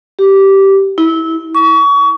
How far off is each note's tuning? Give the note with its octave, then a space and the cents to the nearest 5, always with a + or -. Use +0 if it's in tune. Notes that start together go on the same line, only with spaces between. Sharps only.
G4 -10
E4 -20
C#6 +30